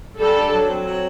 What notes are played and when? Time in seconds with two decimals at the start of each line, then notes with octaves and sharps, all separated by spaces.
0.19 G3 A4
0.36 D4
0.52 F#3
0.68 C4
0.85 F#3